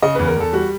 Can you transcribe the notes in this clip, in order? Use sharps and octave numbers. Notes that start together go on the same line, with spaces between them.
C#3 D#5
E2 B4
A#4
E2 A4
G3 F#4